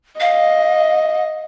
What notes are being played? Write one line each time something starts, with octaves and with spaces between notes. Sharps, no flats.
D#5 F5